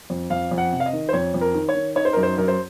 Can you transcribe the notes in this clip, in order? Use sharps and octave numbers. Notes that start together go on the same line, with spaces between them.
F2
F2 F5
F2
F#5
C3
F5
D#5
D#3
C5
F2 C#5
F2
A#4
D#3
C#5
D#3
D#4 C#5
C5
F#2 A#4
C5
F#2 A#4
C5